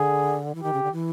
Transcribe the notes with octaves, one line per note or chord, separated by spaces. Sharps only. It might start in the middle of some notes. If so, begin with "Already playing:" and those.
Already playing: D3 G#4
E3
D#3 G4
C#3
D3
E3